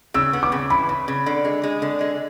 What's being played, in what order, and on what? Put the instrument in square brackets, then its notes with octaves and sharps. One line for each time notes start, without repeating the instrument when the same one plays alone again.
[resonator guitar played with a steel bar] C#3 [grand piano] E6
[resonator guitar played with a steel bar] B3
[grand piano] D6
[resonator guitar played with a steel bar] C#3
[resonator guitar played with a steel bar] E3 [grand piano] B5
[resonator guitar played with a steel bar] C#3
C#3
D3
G#3
G#3
D3
G#3